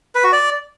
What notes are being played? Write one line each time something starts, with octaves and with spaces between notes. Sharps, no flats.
B4
F#4
D5